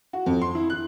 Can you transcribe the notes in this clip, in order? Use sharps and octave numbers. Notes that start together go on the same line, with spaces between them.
F#4
F2
C6
E4
F#6